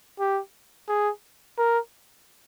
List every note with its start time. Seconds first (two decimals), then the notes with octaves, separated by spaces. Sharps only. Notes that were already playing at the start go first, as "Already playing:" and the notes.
0.19 G4
0.89 G#4
1.58 A#4